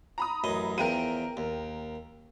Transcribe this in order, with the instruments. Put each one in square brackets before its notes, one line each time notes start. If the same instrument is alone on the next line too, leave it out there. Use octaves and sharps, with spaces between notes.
[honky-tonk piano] A#5 B5 D#6
[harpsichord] A1 F#2 D#5
[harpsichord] E2 F3 [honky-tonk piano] A#4 G5 D#7
[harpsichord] D#2